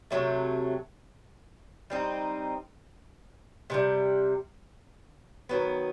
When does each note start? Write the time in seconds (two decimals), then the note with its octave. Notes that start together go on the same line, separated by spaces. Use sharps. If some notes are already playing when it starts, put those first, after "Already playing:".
0.10 C3 D#3 F#3 A3
1.90 G3 C4 D#4
3.70 C3 D#3 G3
5.49 D#3 F#3 B3